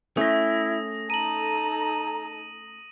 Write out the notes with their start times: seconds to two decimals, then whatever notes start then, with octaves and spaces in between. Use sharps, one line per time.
0.17 A3 C#4 E4 D#6 A#6
1.10 D#4 A4 A#5 D#7 F#7